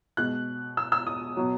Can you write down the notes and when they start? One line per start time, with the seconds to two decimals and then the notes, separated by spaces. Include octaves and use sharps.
0.17 B2 G#3 F#6
0.77 E6
0.92 E6
1.07 D#6
1.37 B2 F#3